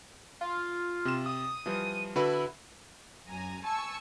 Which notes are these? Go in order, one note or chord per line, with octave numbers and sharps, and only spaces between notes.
F4
C3 E7
D#6
E3 F3 G3
D3 E4 F#4 B4
F#2 G#5 A#5
G#5 A5 C#6 E6